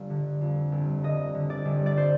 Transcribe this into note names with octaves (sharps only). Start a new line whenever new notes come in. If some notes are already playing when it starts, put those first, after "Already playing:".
Already playing: G1 F5
D3
F2
G1
D3 D#5
D3
D5
G1
D5
C5